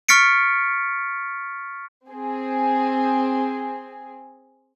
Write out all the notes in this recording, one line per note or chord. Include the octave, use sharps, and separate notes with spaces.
C#6 F6 A6 B6 C#7 D7
C4 G#4